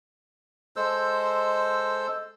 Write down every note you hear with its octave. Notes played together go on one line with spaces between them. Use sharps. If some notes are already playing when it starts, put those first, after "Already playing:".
G#3 A4 C5 E6